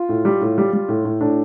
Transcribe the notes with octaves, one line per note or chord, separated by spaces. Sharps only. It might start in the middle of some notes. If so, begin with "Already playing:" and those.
Already playing: F4
A2
G3
A2
G3
G3
A2
A2
A2 D4